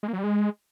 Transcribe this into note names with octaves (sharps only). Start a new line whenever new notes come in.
G#3
A#3
F#3
G3
G#3